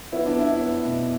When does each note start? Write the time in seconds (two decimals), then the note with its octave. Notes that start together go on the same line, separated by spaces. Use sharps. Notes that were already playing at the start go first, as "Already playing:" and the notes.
0.12 B3 E4
0.26 D4
0.36 B3 E4
0.61 B3
0.85 B2